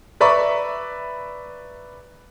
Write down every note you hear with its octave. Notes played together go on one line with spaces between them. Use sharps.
B4 D5 E5 A#5 B5 C#6